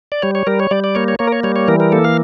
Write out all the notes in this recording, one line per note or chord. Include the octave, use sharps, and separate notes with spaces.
D5
G3 C#5
C#5
G3 A#4
C#5
G3 D5
D5
A#3 C#5
C#5
A#3 C#5
A#4
C#5
G3 C#5
C#5
E3 A#4
A#4
A#3 A4
F5